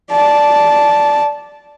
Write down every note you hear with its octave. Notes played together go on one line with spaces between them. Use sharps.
D5 A5